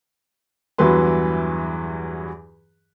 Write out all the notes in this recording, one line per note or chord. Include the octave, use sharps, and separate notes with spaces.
E2 G2 E3 F#3 B4 C6